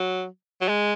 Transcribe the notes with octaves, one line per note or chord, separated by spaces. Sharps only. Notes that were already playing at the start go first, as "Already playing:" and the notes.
Already playing: F#3
F#3
G#3